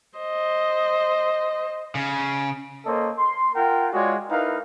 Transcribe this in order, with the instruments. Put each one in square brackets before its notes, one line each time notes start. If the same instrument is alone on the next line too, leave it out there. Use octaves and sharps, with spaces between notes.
[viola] C5 D#5
[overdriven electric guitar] C#3
[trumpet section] A#3 A4 C5 C#5 D#5
C6
F4 A#4 F#5 G5
G#3 F4 F#4 G#4 C#5 D5
D#4 E4 A#4 B4 F5